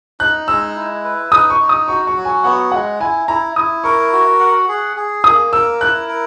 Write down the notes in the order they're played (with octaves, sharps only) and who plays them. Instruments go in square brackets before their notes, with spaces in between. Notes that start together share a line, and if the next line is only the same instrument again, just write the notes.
[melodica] D#4 [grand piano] F#6
[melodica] G#3 [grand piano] E6
[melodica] E4
B4
[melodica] D#4 [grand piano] D#6
[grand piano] C#6
[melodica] D#4
[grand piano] D#6
[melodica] F#4 [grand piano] C#6
[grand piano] C#6
[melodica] F#3
[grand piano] G#5
[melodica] B3 [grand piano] F#5
[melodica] G#3 [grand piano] F#5
[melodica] E4 [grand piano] G#5
[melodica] E4 [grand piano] A#5
[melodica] E4 [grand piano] D#6
[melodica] A#4 [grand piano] C#6
[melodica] F#4
F#5
G#4
G#4
[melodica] A#3 [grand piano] D#6
[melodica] A#4 [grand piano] E6
[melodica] E4 [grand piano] F#6
[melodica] A#4